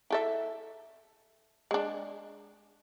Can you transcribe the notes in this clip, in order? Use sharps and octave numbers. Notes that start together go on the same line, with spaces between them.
E4 A4 E5
G#3 D4